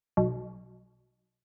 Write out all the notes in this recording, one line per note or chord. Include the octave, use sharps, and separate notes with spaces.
B1